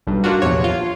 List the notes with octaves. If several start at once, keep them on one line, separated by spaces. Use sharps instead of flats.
B1 G2
A#3 D4 F4 F#4
A#1 E2 C3 C#5
F4